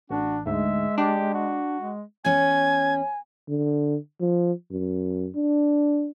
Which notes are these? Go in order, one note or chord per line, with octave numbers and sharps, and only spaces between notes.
A1 D4 F#4
D2 G#2 G#3 E5
D4 G4
F#4
G#3
E2 C#4 G#5 G#6
D3
F3
F#2
D4